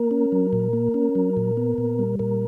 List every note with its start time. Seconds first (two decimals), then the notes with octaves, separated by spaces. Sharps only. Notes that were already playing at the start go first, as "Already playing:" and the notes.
Already playing: A#3 A#4
0.11 C#4
0.32 F#3
0.53 A#2
0.73 A#3
0.94 C#4
1.15 F#3
1.37 A#2
1.57 B3
1.78 A#2
1.99 G3
2.19 A#2 A#4